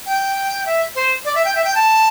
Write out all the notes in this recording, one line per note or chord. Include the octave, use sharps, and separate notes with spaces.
G5
E5
C5
D5
E5
G5
E5
G5
A5